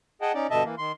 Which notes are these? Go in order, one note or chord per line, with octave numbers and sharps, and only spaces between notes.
G#4 D#5 F#5 G5 A5
C#4 D#4 D5
G2 B2 D3 D#5 E5 A5
E3 A#3
D#3 C6